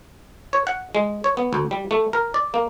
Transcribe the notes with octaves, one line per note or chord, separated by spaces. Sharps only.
C#5
F#5
G#3
C#5
B3
D2
G3
A3
A#4
D5
A#3